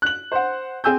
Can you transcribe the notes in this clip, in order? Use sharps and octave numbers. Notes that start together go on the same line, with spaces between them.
F#6 F#7
C5 F#5
C4 G#4 G#5 E6 G6